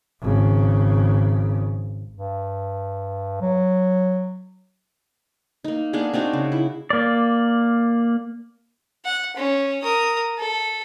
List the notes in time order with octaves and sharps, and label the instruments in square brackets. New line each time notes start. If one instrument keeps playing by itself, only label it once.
[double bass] G#1 C#3
[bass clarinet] G2
F#3
[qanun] A#3 D#4
A#3 B3 D4 G#4
C4 D4 D#4 F#4
C#3
E4
[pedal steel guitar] A#3 D5
[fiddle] F#5
C#4
A#4 D#6
A4